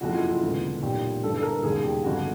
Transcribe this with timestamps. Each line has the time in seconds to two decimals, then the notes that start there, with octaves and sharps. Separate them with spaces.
0.01 F#1 F2 C3 F#4
0.10 F4
0.19 E4
0.29 F4
0.42 E1 D2 C#3 E3
0.82 B1 A#2 G4
1.23 G1 G2 E3 A4
1.37 A4
1.43 A#4
1.63 E1 D#2 C#3 G#4
1.83 G4
2.04 G1 F2 C#3 F#4